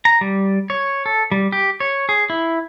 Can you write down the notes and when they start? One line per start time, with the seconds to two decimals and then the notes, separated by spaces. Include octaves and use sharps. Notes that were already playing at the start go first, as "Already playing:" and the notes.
0.05 A#5
0.21 G3
0.70 C#5
1.06 A4
1.32 G3
1.52 G4
1.80 C#5
2.09 G#4
2.30 E4